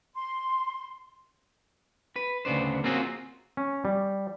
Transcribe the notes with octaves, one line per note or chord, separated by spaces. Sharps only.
C6
B4
D2 C#3 B3 D4 C5
A#3 C4 C#4 F4 F#4 G#4
C#4
G3